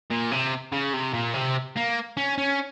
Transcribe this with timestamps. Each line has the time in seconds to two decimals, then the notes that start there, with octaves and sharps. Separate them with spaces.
0.10 A#2
0.31 C3
0.72 C#3
0.94 C3
1.14 A#2
1.34 C3
1.76 A#3
2.17 C#4
2.38 C#4